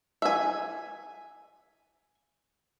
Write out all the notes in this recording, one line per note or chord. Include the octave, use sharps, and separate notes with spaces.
E5 G#5